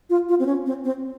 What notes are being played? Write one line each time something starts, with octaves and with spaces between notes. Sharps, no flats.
F4
F4
C4
C#4
C4
C4